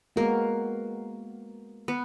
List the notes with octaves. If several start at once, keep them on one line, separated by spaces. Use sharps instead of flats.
G#3 A#3 B3 F#4 A#4
B3